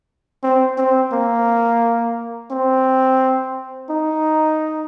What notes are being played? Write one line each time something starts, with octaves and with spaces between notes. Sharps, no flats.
C4
C4
A#3
C4
D#4